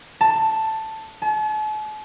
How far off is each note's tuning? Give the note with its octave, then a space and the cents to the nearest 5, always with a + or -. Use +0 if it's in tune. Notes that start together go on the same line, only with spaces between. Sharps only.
A5 +5
A5 -45